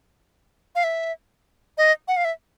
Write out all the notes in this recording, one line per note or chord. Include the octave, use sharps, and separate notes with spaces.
F5
E5
D#5
F#5
F5
E5